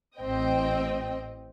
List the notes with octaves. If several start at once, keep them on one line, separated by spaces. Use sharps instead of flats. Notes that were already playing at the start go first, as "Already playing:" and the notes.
A1 C4 D#5 G5